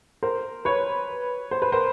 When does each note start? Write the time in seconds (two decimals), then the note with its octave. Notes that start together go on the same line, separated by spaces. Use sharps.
0.23 A#4 C5
0.65 B4 C#5
1.51 C5
1.62 B4
1.72 A#4 C5